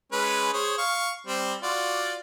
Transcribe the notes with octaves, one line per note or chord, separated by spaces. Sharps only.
G#3 C#4 B4
G#4 C5 C#5
F5 C#6
G3 C4
F4 F#4 D5